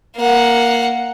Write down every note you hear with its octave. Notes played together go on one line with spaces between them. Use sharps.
A#3 F#5